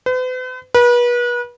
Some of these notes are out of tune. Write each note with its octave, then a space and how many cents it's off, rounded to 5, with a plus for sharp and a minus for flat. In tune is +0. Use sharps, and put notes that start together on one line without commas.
B4 +45
B4 -35